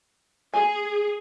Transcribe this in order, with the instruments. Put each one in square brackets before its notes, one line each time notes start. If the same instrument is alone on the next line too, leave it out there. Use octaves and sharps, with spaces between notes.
[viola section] G#4 [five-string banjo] G#5